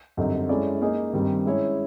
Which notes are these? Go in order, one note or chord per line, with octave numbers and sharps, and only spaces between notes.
F#2 D3 G3 C4 D#4
G#3 C#4 E4 A4 D5
A#3 D#4 G#4
G2 D#3 G3 C4
G#3 C#4 E4 G#4 C#5